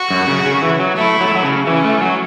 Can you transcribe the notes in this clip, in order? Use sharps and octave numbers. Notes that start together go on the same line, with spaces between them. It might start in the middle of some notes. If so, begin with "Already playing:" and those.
Already playing: F#4
F#2
C#3
C#3
E3
F#3
A3 E4
F#3
A3
F#3
C#3
E3 C#4
A3
F#3